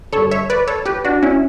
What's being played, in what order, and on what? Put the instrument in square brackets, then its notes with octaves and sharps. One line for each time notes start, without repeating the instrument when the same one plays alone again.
[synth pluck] D3 A4 C#5
G2
C#5 E5
B4 D5
A4 C#5
G4 B4
D4 F#4
C#4 E4